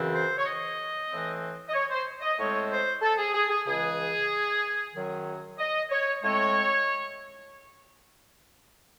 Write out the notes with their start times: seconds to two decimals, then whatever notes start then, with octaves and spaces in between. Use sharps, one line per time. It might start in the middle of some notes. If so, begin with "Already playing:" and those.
Already playing: F#2 C#3 E3 C4
0.13 C5
0.38 C#5
0.45 D#5
1.10 A2 E3 C4
1.69 D#5
1.73 C#5
1.90 C5
2.21 D#5
2.38 A2 G#3 C4 C#5
2.69 C5
3.02 A4
3.18 G#4
3.34 G#4
3.50 G#4
3.66 C#2 C#3 E3 G#3 G#4
4.95 F#2 D#3 F#3
5.59 D#5
5.91 C#5
6.23 A2 G#3 C4 C#5